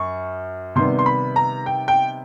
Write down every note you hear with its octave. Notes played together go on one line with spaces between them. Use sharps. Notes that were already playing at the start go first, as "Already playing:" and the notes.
Already playing: F#2 C#6
C3 D#3 G3 B3 C6
C6
B5
A#5
G5
G5